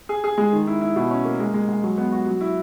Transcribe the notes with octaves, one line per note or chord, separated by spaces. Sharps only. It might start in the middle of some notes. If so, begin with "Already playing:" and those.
G#4
G#4
G#3
D#3
E4
E4
B2
C#4
A#3
G#3
G#3
G#3
F#3
B3
F#4
F#3
E4